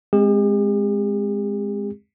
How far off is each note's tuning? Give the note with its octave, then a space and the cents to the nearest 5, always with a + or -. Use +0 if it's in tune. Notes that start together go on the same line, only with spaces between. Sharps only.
G#3 +0 C4 +0 G4 +45